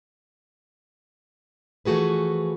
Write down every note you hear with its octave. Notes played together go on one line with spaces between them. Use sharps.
E3 F3 A3 F#4 G#4 B4